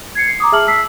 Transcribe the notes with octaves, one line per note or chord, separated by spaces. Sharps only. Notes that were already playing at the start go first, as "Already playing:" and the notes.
G#6 C7 C#7
C7
A#5 D6 D#6
G#4 E5 A5 F6 F#7
A5 E6 B6 C7